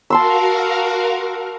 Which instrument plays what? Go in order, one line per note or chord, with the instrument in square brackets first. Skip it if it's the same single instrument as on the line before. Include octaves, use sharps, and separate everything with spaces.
[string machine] F#4 A#4 F5 [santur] A5 C6 E6